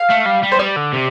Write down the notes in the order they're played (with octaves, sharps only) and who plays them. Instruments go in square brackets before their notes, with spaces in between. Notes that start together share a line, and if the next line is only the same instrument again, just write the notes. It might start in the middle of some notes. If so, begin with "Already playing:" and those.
Already playing: [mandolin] F5
[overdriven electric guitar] A3
G3
G3
[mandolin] C5
[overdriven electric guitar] G3 [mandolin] D5
[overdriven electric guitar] D3
C3